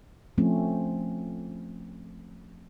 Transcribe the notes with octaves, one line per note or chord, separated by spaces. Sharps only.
F3 A3 C4 C#4